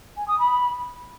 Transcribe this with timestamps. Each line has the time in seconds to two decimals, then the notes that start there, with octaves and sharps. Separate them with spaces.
0.17 G#5
0.28 D#6
0.39 B5